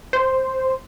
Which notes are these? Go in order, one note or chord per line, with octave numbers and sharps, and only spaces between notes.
C5